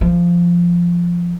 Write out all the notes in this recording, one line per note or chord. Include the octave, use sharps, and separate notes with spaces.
F3